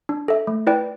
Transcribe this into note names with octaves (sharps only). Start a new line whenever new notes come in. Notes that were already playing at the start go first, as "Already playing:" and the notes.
D4
A4 E5
A3
E4 B4 D5 G5